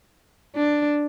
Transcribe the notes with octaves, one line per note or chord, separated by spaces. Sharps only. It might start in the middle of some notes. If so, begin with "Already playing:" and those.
D4